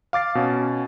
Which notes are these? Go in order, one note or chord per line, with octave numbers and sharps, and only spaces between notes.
F5 D6 A6 C7
B2 C#4